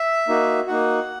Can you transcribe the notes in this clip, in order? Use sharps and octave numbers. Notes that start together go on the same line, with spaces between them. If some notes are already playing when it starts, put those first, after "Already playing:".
Already playing: E5
A#3 D#4 F#4
A#3 D#4 F#4 F#5